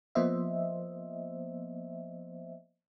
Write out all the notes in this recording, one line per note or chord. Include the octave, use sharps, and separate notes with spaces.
F3 A#3 B3 C5 D#5 E5